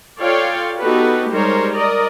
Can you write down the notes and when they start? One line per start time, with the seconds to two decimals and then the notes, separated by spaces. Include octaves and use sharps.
0.20 F4 A4 C#5 D5 F5 G5
0.79 B3 D#4 F#4 G4 A4 B4
1.31 G3 G#3 D#4 A#4 C5 C#5
1.73 A#4 D5 D#5